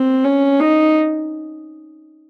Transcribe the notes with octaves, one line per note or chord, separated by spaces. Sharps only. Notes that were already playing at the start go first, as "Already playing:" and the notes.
Already playing: C4
C#4
D#4